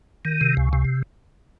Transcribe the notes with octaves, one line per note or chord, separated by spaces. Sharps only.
D#3
C3
C#2
C3